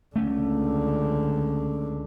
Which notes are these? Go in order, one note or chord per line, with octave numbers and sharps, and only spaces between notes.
C#2 D3 A3 C#4